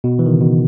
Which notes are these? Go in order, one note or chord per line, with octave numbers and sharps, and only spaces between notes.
B2
E3
D#3
C#3
B2